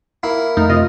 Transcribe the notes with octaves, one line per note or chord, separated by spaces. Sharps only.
A#3 E4
F2 A3 D#4 F6
C3 F4 D#5